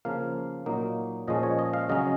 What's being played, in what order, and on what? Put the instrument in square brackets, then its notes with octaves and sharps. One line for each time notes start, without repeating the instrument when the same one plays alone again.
[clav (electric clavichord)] C#3 F3 A#3 F5
A#2 F#3 A#3 D#4
A#2 F3 G#3 C#4 D#5
C#5
D#5
F5
C#3 F#3 C#4 D#5